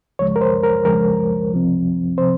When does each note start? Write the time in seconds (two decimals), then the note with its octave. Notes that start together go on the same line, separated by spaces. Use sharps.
0.19 C#2 C#3 F3 G#3 C#5
0.36 A#4
0.41 C5
0.63 A#4
0.85 C#2 C#3 F3 G#3 A#4
1.51 C2 C3 F3 C4
2.17 C3 F3 C4 C5